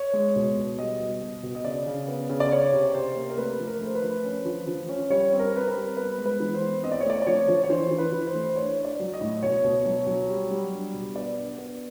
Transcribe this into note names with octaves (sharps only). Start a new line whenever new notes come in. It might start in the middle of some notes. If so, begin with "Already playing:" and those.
Already playing: C#5
G#3
B2
B2
G3 D#5
B2
B2
B2
D#5
C#3 D5
C#3
B3
C#3
D5
C#4 C#5
C3
C3 C5
A#3
A#4
A3 B4
F3
A#4
A3 C5
B4
F3
C#4
F3
F3
C#4
G3 C#5
C4
A#4
C4 B4
A#4
G3
B3 B4
G#3
B4
E3
C5
B3
C4 D#5
D5
C#5
A3 D5
D5
F3 C#5
F3
C#5
E3 C5
E3
B4
E3
C5
A3
C5
D4 C#5
D4
D5
F#3
D#5
A2
B2 C#5
B2
F#3
F#3
G3
G3
D4
B2
B3 D5
D4
B3